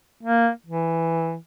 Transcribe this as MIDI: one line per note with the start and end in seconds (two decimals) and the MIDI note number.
0.23 0.50 58
0.67 1.36 52